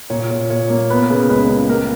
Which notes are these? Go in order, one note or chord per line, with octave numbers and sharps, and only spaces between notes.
A#2 C#5
A#2
A#2 C#5
A#3
B3 B4
C#3
C#2 B4
C#2
A#3 A#4